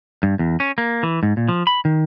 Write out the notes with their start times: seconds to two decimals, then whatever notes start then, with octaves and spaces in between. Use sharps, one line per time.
0.23 G2
0.39 E2
0.60 C#4
0.78 A#3
1.03 E3
1.23 G#2
1.37 A#2
1.49 F3
1.67 B5
1.85 D#3